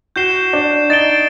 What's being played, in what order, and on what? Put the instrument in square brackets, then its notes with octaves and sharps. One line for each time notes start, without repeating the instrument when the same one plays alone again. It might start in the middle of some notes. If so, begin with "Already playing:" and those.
[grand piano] F#4 [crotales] G6 C7 E7 G7
[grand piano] D4
[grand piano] D#4 [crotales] A6 D7 G7